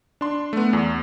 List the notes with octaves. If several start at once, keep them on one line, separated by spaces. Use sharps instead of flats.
D4 C6
A3 B3
E2